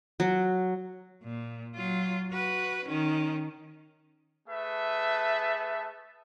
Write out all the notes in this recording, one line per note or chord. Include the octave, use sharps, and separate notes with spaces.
F#3
A#2
F#3 F4
F#4 B4
D#3 C#4
A3 G#4 B4 E5 A5